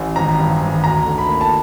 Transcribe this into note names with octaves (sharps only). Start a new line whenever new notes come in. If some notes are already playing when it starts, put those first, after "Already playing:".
Already playing: A1
G#1 A#5
G2
G#1
D2 A#5
D3
B5
A#3
A5